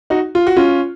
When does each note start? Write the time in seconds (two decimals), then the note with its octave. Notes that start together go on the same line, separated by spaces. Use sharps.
0.10 D#4 F#4
0.35 F4
0.47 F#4
0.57 C#4 F4